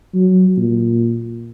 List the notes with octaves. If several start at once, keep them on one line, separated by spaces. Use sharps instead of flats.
F#3
A#2